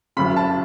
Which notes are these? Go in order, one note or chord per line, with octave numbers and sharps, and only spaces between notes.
F#1 F#2 C#3 B5
A5